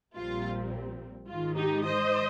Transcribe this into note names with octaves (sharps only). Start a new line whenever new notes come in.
A#1 A#2 G3 C4 F4
G#2 D#3 G#3 F4
D#4 G4
C5 D#5